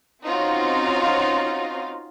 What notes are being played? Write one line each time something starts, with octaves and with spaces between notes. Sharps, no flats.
C4 C#4 D#4 F4 F#4 F5